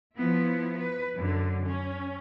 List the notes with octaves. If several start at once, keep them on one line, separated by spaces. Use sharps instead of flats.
F3 B3 E4
B4
F#2 D3
C#4